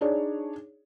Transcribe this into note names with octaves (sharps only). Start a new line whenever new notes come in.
D4 D#4 G#4 C#5 D5